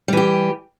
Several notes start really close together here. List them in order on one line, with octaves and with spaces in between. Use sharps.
G3 E3 G4